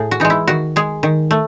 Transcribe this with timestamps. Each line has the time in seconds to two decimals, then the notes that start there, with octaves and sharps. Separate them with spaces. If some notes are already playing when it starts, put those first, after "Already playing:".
Already playing: A2 G#4
0.11 F#4
0.20 E3 G#3 D#4
0.30 E4
0.47 D#3 F#4
0.76 G#3 G#4
1.03 D#3
1.31 A3